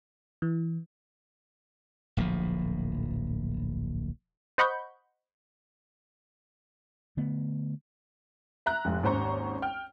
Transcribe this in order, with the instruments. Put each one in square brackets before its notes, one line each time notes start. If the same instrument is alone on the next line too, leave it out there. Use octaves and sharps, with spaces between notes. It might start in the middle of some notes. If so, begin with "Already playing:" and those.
[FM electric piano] E3
[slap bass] D1 A#1 A2 F3
[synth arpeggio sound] C5 D#5 F#5 B5 C#6 G6
[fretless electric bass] D3 A3 B3
[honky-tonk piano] E5 A#5 F#6
F1 G#2
G#1 D#2 C#4 C5 A#5 C#6
G5 F6